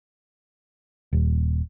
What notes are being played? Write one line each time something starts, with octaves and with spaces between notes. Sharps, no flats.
D#1